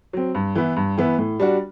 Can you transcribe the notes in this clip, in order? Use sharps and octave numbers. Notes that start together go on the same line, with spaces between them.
F#3 C4
G2
E3 B3 E4
G2
E3 B3 E4
A2
G3 D4 F#4